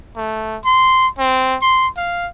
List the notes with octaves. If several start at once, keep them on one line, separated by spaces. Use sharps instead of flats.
A3
C6
C4
C6
F5